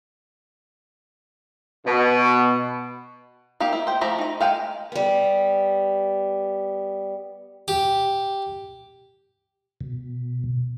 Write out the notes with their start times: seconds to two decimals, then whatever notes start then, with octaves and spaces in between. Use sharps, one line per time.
1.86 B2
3.60 A#3 D#4 G4
3.73 E4
3.87 C5 G5
4.01 F3 A3 E4 G4 A#5
4.18 D#4 A#5
4.41 G#3 F5 G5 G#5
4.92 G3 B3
7.68 G4
9.81 B2